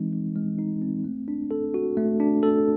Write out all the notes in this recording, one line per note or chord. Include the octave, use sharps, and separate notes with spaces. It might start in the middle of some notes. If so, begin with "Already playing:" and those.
Already playing: E3 G#3 C4 D#4
E3
G#3
D#4
C4
A3
D4
A4
F#4
A3
D4
A4